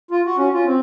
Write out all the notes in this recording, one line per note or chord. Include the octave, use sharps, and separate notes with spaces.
F4
F#4
C#4
F4
C4